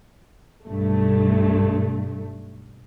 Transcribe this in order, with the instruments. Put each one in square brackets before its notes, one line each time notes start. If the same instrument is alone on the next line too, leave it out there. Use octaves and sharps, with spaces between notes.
[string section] B1 G2 A3